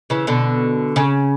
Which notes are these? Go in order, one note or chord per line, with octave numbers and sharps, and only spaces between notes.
C#3 E3
B2 D3
C#3